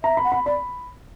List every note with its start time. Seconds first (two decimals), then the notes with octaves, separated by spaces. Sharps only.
0.03 E5 A#5
0.17 B5
0.24 F#5
0.32 B5
0.46 D5 B5